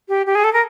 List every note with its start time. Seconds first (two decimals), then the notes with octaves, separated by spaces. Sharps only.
0.09 G4
0.26 G4
0.35 G#4
0.44 A4
0.53 A#4